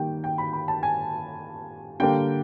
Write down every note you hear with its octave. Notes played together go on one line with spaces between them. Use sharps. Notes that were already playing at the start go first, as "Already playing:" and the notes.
Already playing: D#3 G3 A#3 G5
G5
B5
B5
A5
G#5
D3 G3 A#3 G5